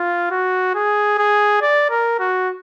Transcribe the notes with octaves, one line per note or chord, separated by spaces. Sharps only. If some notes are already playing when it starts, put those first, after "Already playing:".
Already playing: F4
F#4
G#4
G#4
D5
A#4
F#4